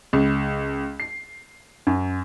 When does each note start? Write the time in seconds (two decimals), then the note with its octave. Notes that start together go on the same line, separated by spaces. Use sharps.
0.13 C#2
1.00 C7
1.87 F#2